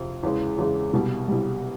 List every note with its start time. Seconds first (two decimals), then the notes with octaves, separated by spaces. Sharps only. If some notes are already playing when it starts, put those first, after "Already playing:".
Already playing: F2 C3
0.23 E2 C#3 E3 G#3
0.58 E2 C#3 E3 G#3
0.93 C2 B2 G3
1.28 C2 B2 G3